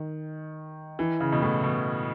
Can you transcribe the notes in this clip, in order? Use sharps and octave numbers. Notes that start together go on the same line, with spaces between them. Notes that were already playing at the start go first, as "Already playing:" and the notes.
Already playing: D#3
E3
C#3
B2
A2
B2